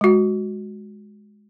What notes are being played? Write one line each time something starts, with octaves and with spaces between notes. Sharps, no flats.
G#3 F#4